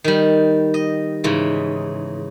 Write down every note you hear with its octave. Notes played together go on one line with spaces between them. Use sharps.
D#3 G3
D#5
G#2 C#3 E3